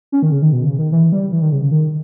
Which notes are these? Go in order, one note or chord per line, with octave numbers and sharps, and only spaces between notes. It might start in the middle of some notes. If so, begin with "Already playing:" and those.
C#4
D#3
C#3
D#3
B2
C#3
D#3
E3
G3
E3
D#3
C#3
C#3
D#3